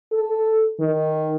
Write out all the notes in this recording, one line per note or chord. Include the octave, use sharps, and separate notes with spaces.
A4
D#3